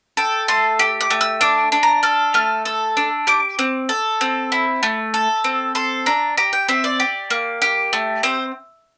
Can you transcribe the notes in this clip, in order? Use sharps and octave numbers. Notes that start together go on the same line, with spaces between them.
A4 G5
A3 C6
G4
D6
A3
E6
D4 D6
D4
A#5
A4 F6
A3 F6
A4 E6
D4
G4 D6
C4
A4
C4
E4
A3
A4
C4
A4 C6
D4 A#5
G4 A#5
G5
C4 E5
D5
G4
A#3
G4
A3
C4 C5